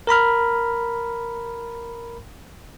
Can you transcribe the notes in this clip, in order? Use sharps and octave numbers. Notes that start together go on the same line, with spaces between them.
A#4 A#5 B5 F6